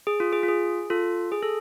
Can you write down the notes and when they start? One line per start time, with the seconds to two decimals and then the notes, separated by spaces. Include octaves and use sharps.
0.07 G#4
0.20 F4
0.33 G#4
0.43 F4
0.48 G#4
0.90 F4 A4
1.32 G#4
1.43 A4